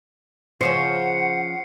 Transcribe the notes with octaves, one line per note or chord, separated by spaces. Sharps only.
C#3 F3 C#4 C5 F#5 C7 C#7